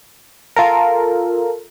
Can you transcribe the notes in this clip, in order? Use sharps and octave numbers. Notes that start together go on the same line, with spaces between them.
F4 A4 A#4